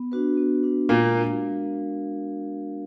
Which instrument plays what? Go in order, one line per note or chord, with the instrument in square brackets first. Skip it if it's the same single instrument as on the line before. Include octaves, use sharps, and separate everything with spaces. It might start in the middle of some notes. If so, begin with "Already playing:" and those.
Already playing: [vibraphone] B3
D4 F#4 B4
B3
D4 F#4 B4
[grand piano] A#2 A#3 [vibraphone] G#3
[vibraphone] D4 F#4 A#4 F5
G#3